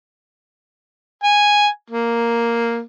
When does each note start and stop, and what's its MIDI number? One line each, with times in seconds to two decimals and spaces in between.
1.24 1.67 80
1.90 2.81 58